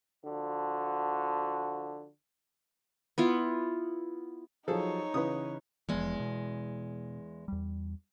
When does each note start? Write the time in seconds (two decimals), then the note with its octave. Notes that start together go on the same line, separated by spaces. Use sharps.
0.25 D3 F3 F#4
3.18 B3 E4 F4
4.68 F3 F#3 D#4 G#4 A4 C#5
5.14 C#3 E3 B4 D#6
5.89 F1 E2 F3 G#3
6.20 B2
7.48 E2 G3